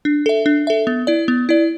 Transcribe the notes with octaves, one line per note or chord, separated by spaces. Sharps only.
D4
A4 E5
D4
A4 E5
B3
E4 D5
B3
E4 D5